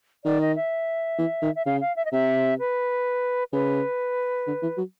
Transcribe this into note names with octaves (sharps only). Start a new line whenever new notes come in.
D#3 D5
D#5
E5
E3
D#3
E5
C#3 F5
F5
E5
D#5
C3 E5
B4
C#3 B4
D3
E3
F#3